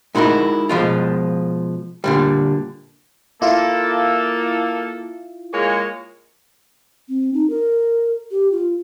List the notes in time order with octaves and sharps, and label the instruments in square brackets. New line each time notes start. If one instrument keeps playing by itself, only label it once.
[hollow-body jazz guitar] G#3 D#4 E4 F#4 A#4
B2 F3 G#3 F4
A#2 D3 G3
[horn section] A#3 A4 [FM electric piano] E4 F4
[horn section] G#3 A#3 C#5
[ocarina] C4
D#4
A#4
G4
F4